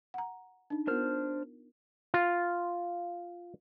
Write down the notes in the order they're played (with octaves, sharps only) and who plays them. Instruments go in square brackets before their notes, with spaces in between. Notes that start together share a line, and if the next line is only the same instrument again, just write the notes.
[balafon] F#5 A#5
D4 D#4
[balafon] B3 F4 A#4 [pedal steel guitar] D4 C5 F6
[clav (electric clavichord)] F4